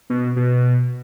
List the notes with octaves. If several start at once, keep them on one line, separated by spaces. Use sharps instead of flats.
B2
B2